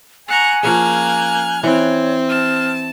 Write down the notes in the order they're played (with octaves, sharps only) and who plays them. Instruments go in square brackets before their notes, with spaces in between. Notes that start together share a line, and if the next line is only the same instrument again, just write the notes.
[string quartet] F#5 A#5 C#6 [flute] G#5
[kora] F3 C#4 G#4 [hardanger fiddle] A#3 [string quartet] F6 F#6 G#6
[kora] E3 [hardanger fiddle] C4 [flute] C#5
[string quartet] A5 [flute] F6